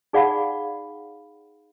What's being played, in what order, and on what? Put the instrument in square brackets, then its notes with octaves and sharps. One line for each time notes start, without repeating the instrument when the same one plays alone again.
[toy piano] D#4 G#4 D5 F5 F#5 B5